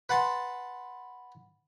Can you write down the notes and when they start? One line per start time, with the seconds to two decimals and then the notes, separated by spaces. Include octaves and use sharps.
0.09 B4 F#5 A5 C6